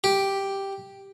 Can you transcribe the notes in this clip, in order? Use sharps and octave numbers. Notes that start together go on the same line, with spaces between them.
G4